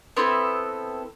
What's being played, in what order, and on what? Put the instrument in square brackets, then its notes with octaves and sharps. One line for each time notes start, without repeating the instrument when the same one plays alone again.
[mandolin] B3 C4 E4 A4